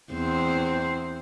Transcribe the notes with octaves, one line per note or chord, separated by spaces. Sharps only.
E2 C4 C5